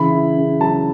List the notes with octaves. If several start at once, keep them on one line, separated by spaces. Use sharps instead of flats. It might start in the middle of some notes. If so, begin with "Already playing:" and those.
Already playing: C#3 E3 B5
E4
C#3
F#3 A5